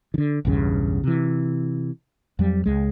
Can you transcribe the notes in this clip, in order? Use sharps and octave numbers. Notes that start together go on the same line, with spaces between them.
D3 D#3
B1 E2 G2 C#3
C3 E3
F2 F#3 G3
C#2 G#3